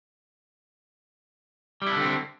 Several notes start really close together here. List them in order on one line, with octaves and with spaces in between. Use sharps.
G3 E4 D4 D3 C4